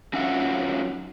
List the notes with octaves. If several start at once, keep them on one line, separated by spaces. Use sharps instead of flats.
F#3 C#4 D#4 F4 E5 F#5